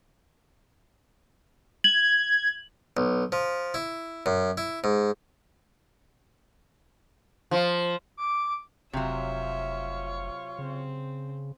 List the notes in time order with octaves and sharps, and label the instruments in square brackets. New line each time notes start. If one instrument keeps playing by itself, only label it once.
[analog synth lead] G#6 [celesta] F#7
[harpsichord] B1
F3
E4
F#2
E4
G#2
[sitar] F3
[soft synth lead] D6
[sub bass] F1 [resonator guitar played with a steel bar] C3 F#3 [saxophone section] F4 C#5 F5 [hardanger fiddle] E5
[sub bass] C#3 [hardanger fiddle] C4